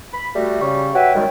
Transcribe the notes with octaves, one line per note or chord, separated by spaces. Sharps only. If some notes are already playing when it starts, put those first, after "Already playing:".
B5
G3 A3 F#4
C#3 C#6
F#4 B4 C#5 E5 G5
F#2 D#3 G3 G#3